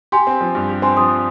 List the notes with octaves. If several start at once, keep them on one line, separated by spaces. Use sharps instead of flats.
G4 G#5 C6
C4
F3
G2
G4
C4 G#5 C6
F3 C6 D#6